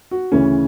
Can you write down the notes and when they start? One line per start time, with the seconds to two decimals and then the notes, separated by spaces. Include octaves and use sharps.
0.11 F#4
0.32 D2 C#3 E3 C#4